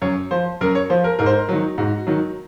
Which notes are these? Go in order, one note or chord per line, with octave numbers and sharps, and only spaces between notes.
F#2 C#5
F3 C5
F#2 A#4
C#5
F3 C5
A#4
G#2 A#4
C5
A#4
D#3 F#3
G#2 F#4
D#3 F#3